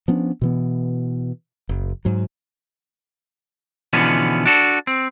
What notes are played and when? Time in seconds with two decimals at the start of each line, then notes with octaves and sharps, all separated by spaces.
0.08 F3 B3 C#4 D4
0.41 B2 E3 B3
1.69 F#1
2.05 G#2 F#3
3.93 B2 D3 E3 F3 B3 C#4
4.46 D4 F#4 A4
4.87 C4